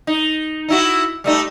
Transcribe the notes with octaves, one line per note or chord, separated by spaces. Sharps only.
D#4
D#4 E4 F#4
G3 A3 D#4